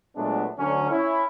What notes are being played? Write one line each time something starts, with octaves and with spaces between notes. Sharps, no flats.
A#2 F#3 G#3 A3 B3 D4
D2 D3 F#3 C#4
C#4 E4